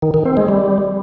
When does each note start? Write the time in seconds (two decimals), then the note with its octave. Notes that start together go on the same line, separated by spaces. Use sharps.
0.02 D#3
0.14 D#3
0.25 C4
0.37 G#3
0.48 G3